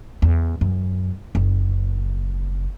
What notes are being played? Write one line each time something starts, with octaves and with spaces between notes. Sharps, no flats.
E2
F#2
F#1